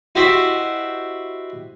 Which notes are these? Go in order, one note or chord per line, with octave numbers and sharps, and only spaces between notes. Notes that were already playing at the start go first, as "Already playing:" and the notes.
E4 F#4 G4 C5 D#5 E5